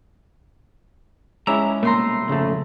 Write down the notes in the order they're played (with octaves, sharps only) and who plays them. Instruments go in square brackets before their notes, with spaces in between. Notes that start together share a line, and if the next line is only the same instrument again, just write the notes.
[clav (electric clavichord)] G#3 C#4 E4 [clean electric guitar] A#5 [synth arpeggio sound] D6 E6
[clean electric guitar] C2 B2 A3 [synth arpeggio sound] A#3 [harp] A#5 C6 E6
[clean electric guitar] F2 G#2 [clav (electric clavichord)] C#3 A3